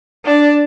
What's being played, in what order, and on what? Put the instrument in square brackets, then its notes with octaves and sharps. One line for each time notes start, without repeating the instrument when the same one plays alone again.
[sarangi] D4